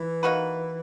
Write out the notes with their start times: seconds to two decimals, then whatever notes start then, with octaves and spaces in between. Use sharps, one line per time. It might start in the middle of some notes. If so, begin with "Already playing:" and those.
Already playing: E3
0.23 A#3 D#4 F#4 B4